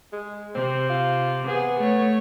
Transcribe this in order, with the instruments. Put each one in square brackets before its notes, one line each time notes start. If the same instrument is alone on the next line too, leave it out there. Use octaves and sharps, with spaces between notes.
[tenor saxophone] G#3
[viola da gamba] C3 [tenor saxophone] C4
[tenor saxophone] F4
[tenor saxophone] B3 [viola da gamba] G#4
[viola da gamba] A3 C#5